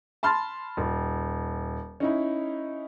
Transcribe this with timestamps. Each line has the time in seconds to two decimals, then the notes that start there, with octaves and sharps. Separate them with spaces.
0.23 A5 B5 C6 F6 A6
0.77 D#1
2.00 C#4 D#4 E4